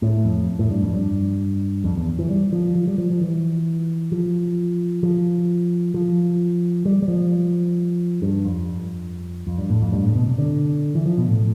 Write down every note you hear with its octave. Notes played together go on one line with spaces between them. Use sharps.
A2
F2
A2
G2
F2
G2
F2
E2
E3
G3
F3
F3
G3
F3
F3
E3
F3
F3
F3
G3
G3
F3
G2
F2
F2
G2
A2
F2
G2
A2
B2
C3
D3
E3
F3
B2
A2